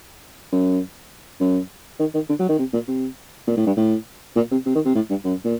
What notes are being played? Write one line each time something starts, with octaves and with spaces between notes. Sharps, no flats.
F#2
F#2
D#3
D#3
D3
F#3
D#3
C3
A#2
C3
A#2
A2
G2
A2
A#2
C3
C3
D#3
C3
A2
G2
F#2
A#2